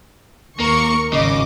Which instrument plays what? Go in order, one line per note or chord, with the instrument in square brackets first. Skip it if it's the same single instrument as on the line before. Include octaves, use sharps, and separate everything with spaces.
[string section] D#2 A#4 C#6 [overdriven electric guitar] A#3
[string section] G#1 D#5 D6 [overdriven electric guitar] C#3